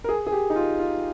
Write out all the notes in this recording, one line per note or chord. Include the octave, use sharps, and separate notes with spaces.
A#4
G#4
G#4
G4
D#4
F4
F4